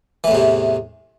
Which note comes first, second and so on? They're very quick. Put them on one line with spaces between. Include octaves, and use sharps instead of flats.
E3 A2 E2 C3